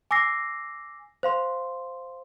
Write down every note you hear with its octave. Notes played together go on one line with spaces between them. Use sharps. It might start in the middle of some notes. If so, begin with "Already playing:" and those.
G#5 D6 E6 A#6 C7
C5 F5 C6